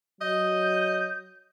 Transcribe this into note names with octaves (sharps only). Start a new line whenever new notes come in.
F#3 D#5 G6